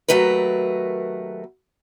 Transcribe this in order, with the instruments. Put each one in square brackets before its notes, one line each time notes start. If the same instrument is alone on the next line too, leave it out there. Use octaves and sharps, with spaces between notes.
[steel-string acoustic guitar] D#2 F#3 A3 A#4 B4